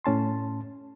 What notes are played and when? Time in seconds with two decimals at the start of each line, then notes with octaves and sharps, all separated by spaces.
0.04 A2 C#4 A5 C6